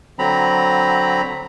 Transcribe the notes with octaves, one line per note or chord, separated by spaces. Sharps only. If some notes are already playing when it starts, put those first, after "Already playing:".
D3 F#3 C4 A#5 B5